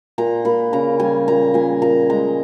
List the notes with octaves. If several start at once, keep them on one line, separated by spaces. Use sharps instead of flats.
A#2 A#5
A#2 B5
C#3 A#5
G3 G#5
A#2 A#5
A#2 G#5
A#2 A#5
G#3 A#5